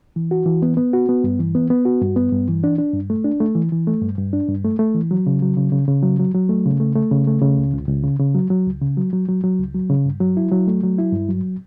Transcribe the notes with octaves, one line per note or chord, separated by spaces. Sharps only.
E3
F#4
E3
B3
B3
F#4
B3
G2
E3
B3
B3
F#4
G2
B3
G2
E3
D4
D4
G2
A3
D4
A3
E3
E3
A3
G2
G2
D4
G2
A3
A3
E3
F#3
C#3
F#3
C#3
C#3
C#3
F#3
F#3
F#3
A3
C#3
A3
A3
C#3
A3
C#3
C#2
C#2
C#2
C#3
C#3
F#3
F#3
C#2
C#3
F#3
F#3
F#3
F#3
C#2
F#3
C#3
G2
F#3
E4
F#3
A3
F#3
E4
G2
F#3